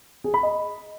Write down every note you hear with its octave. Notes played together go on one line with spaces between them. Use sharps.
G#4
B5
D#5